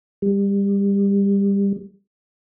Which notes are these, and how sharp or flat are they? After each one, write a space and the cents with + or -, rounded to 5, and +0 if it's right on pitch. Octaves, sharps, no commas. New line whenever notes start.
G3 +25